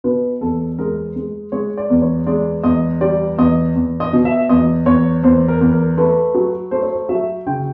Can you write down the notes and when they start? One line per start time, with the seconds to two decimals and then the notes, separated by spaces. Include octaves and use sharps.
0.04 B2 B4
0.41 E2 A4
0.79 G#3 A#4
1.16 G#3
1.52 G#3 C#5
1.78 D5
1.90 E2
2.02 C#5
2.26 G#3 D5
2.64 E2 D#5
3.01 G3 D5
3.38 E2 D#5
3.75 E2
4.00 D#5
4.13 B2
4.25 E5
4.49 E2 D#5
4.86 E2 C#5
5.23 E2 C5
5.48 A#4
5.61 E2
5.73 A#4
5.97 A3 B4
6.35 F#3
6.71 A3 C5
6.82 C#5
6.92 C5
7.09 F#3 E5
7.46 C#3 G5